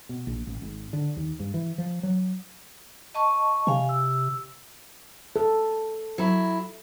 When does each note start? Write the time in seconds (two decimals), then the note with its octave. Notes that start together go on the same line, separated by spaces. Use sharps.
0.09 B2
0.27 A#1
0.47 A1
0.62 G#1
0.93 D3
1.16 D#2
1.40 G2
1.54 E3
1.78 F3
2.03 F#3
3.15 D#5 A5 C#6
3.67 C3 F5 G#5
3.89 E6
5.36 A4
6.18 F#3 E4